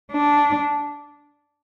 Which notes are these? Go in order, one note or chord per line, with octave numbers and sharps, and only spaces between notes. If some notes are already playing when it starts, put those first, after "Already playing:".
D4